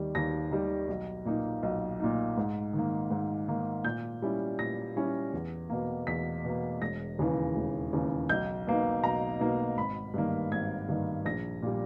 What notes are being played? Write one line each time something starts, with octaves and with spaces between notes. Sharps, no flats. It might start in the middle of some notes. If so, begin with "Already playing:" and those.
Already playing: D#2 D#3 G3
D#2 A#6
D#3 G3
B1
A#2 A#3 D#4
B1
A#2 A#3 D#4
G#2
D#3
A#3
G#2
D#3 A#3
A#2 G6
G3 C#4 E4
A#2 A#6
G3 C#4 E4
E2
B2 A#3
E2 B6
B2 A#3
E1 A#6
D#2 C#3 E3
E1
D#2 C#3 E3
B1 G6
B2 A#3 D#4
B1 A#5
B2 A#3 D#4
G#1 B5
G2 D#3 A#3
G#1 G#6
G2 D#3 A#3
A#1 A#6
A#2 G3